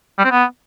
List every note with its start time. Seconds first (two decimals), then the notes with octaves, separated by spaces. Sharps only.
0.19 G3
0.25 C4
0.31 B3